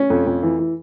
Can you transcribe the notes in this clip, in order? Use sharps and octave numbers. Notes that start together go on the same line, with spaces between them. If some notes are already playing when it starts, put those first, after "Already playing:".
Already playing: C#4
F2
F2
E3
E3